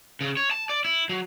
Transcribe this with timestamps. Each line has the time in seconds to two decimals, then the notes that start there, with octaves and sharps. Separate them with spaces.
0.21 C#3
0.37 C#5
0.51 A5
0.69 D5
0.85 E4
1.09 F#3